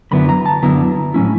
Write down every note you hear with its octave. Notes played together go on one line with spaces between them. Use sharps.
F#2 D3 F#3 B3 E4 B5
A#5
A5
F#2 D3 F#3 B3 E4 A#5
A2 F#3 A3 C#4 E4